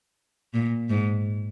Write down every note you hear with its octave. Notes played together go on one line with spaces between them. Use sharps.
A#2
G#2